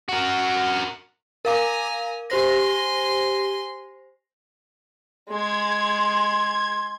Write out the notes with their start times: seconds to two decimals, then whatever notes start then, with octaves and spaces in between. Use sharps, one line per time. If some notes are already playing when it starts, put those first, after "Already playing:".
0.09 F#4 A#4
1.45 A#4 F5 G#5 A#5 D6
2.30 G4 C5 G#5 C6 A#6
5.30 G#3 C6 G#6